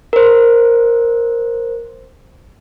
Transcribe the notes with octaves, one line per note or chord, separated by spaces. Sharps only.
A#4 C5